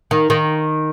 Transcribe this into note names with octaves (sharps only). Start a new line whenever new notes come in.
D#3
D#3